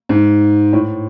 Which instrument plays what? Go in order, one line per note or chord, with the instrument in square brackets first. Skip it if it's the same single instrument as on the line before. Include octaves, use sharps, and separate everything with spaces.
[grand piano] G#2
A2